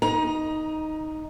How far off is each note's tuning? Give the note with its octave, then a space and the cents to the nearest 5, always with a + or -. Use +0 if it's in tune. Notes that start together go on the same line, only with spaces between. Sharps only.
D#4 +0 A#5 +25